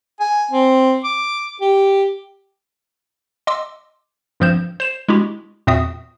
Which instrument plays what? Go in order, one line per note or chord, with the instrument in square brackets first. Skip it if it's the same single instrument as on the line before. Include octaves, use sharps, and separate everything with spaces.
[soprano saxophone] G#5
C4
D6
G4
[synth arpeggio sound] D#5 C6 D6 E6
G#1 G2 F3 C4 G6 E7
C5 C7 E7
G#3 D4 E4 F#4 G4
E2 A#2 C4 F#4 E5 D#6